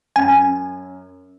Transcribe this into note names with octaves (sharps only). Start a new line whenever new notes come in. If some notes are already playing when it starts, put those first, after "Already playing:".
F#2 G#5